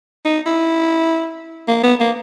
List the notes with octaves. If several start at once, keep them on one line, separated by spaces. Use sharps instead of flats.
D#4
E4
A#3
B3
A#3